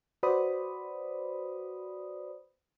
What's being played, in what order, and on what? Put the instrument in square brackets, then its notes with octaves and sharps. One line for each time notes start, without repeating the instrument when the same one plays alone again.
[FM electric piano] F#4 B4 C5 D5 B5 D#6